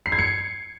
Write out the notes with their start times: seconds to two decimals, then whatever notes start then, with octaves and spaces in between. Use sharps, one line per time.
0.06 C7
0.12 G#6
0.19 C#7